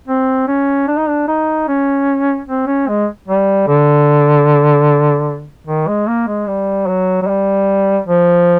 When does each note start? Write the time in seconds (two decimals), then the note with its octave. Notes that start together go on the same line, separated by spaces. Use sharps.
0.08 C4
0.47 C#4
0.87 D4
0.97 D#4
1.08 D4
1.28 D#4
1.68 C#4
2.48 C4
2.67 C#4
2.88 G#3
3.28 G3
3.67 D3
5.67 D#3
5.87 G#3
6.07 A#3
6.27 G#3
6.48 G3
6.87 F#3
7.22 F#3
7.27 G3
8.07 F3